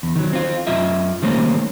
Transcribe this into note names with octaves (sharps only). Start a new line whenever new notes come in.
E2
D#3 F#3
C4 F4
F#2 F4 D#5 E5
D#3 G3 A3 A#3 C4 C#4